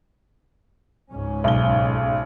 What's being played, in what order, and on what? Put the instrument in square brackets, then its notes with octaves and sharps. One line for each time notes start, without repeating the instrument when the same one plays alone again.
[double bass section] C#2 G#2 C#4
[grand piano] B1 G7